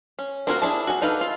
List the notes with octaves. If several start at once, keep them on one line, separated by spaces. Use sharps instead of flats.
C#4
A#3 C4 F4 F#4 A#4
D4 E4 G#4 A5
F#4 G#5
D4 D#4 A4 B4 F5
F4